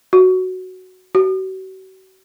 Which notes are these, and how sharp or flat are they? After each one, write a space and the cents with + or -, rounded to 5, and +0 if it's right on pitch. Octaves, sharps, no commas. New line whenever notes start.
F#4 +0
F#4 +40